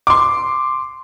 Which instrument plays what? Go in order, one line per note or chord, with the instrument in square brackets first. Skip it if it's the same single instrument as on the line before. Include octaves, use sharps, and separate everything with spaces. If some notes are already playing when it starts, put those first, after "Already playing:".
[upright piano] C6 D6